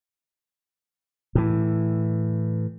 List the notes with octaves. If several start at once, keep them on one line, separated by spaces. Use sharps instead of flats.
A2 E3